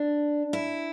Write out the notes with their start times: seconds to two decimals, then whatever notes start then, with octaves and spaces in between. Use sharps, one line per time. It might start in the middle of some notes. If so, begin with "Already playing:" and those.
Already playing: D4
0.53 E4